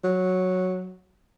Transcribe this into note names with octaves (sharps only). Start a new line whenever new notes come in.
F#3